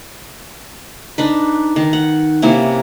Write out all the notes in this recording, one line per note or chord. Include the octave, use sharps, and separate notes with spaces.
D4 D#4 B4
D#3
F#5
C3 A#3 C#4 E4